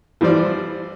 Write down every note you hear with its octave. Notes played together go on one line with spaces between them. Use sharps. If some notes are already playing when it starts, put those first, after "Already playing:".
E3 F3 G3 C5 D5